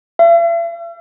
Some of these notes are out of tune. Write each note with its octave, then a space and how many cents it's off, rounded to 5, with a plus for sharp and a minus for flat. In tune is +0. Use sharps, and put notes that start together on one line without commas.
E5 +45